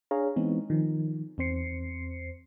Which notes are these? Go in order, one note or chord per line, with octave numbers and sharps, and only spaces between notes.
D4 G#4 C#5 F5 A#5
E3 G#3 B3 C4 D#4
D#3 F3
E2 C4 C5 C7 C#7